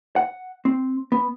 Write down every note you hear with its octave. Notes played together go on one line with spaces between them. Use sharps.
F#5
C4
B3